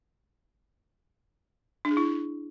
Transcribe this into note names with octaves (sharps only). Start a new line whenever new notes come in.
D4
G#4
E4